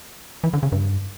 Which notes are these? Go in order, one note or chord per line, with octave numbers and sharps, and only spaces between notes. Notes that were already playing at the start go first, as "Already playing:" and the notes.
E3
D3
C#3
G2